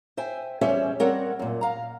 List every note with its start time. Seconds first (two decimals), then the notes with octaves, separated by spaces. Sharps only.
0.17 C5 E5 G5 G#5
0.61 E2 G3 C#4 C5 C#5 E5
1.00 G3 C4 A#4 C#5 F#5
1.39 F#2 A#2
1.61 F5 A#5